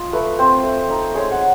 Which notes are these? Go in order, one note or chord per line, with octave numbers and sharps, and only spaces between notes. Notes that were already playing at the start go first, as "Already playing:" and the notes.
Already playing: F4 D#5
A3 B4
C4 C5
A3
D#4
G#3 C#5
F#5